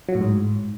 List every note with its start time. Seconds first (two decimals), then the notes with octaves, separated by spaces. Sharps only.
0.09 F#3
0.15 A2
0.21 G#2